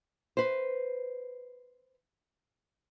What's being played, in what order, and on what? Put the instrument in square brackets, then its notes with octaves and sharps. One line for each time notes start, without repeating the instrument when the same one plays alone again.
[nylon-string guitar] B4 C5